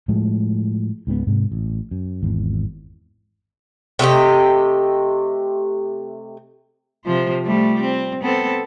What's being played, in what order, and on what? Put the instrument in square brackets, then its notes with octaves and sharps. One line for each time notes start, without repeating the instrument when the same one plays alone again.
[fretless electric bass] A2 F3 G#3 A3
C#2 G#2 F#3 B3
G#2 C3
A1
F#2
G#1 E2
[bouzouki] C3 A3 G4 D#5
[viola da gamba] C3 F3 C5
F3 G3 A3
C4
B3 C4 A4